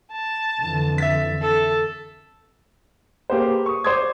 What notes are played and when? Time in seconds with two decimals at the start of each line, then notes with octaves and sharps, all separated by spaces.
0.12 A5
0.58 F2 D3 E3
0.98 E5 A6 B6
1.42 A4
3.30 A#3 G4 G#4 B4 C5
3.66 C#6 D#6
3.84 C5 D5 C6 D6 D#6 G#6